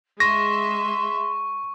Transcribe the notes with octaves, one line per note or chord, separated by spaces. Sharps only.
G#3 E5 C6 C#6 A#6